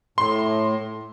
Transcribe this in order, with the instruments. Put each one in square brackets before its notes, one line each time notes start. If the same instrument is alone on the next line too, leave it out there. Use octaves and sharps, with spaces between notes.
[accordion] A2 [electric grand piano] C6